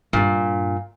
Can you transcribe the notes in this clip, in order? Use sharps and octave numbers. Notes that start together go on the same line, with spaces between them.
G2 A#2 D4